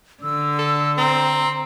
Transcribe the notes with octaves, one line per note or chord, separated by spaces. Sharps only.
D3 E6
A4
C4 A#5